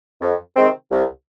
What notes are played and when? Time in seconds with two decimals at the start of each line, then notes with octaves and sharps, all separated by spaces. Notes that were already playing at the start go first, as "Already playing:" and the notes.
0.21 F2
0.56 C3 D#3 G#3 C4
0.91 C2